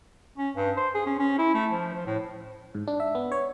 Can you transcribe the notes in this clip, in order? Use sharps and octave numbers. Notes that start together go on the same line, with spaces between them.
C#4
G2
C5
G#4
C#4
C#4
E4
A3
F3
F3
A2
G#2
D4
E5
B3
C#5